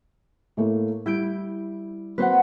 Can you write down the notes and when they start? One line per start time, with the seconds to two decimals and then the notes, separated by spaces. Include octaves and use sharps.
0.57 A2 A3 A#3
1.06 G3 E4 G6 D7
2.18 F#3 A#3 C4 B4 C5 F#5